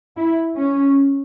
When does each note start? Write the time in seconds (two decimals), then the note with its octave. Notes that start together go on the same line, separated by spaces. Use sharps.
0.17 E4
0.56 C#4